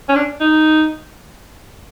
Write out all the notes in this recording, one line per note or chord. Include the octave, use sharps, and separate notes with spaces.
C#4
D4
D#4